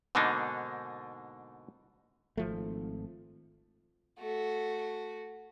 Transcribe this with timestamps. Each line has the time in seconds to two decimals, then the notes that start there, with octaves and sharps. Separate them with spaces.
0.15 G#2 B2 D3 A#3 D4 D#4
2.37 G#1 F3 A3
4.20 A3 F#4